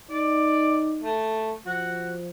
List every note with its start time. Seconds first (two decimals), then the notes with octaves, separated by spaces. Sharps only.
0.10 D#4 D5
1.03 A3
1.66 F3 F#4